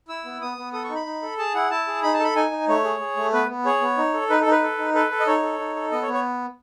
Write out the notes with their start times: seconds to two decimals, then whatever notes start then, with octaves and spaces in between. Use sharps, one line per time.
0.08 E4 E6
0.25 B3
0.41 B3 D#6
0.57 B3
0.73 A4 D#6
0.84 C#6
0.89 D#4
0.95 B5
1.06 D#4
1.22 A4
1.38 G#4 A5
1.55 E4 F#5
1.71 E4 A5
1.87 G#4
2.03 D#4 B5
2.14 A5
2.19 A4 B5
2.36 D#4 G#5
2.51 D#4
2.68 A3 C#5
2.84 G#4
3.00 G#4
3.17 A3
3.33 B3 B4
3.49 B3
3.65 G#4 C#5
3.81 B3
3.97 D#4
4.14 A4
4.30 D#4 B4
4.41 A4
4.46 D#4
4.51 B4
4.62 A4
4.78 D#4
4.94 A4 B4
5.11 A4
5.20 D#5
5.27 D#4 C#5
5.43 A4
5.59 D#4
5.76 A4
5.92 B3 D#5
6.02 C#5
6.08 B3
6.13 C#5